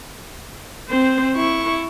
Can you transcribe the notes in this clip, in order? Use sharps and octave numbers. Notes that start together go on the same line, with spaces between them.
C4 C5
E4 C#6